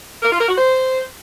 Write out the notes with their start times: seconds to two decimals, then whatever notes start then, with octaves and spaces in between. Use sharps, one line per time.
0.22 A#4
0.31 F4
0.40 A#4
0.49 F#4
0.57 C5